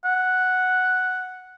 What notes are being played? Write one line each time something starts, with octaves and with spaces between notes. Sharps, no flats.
F#5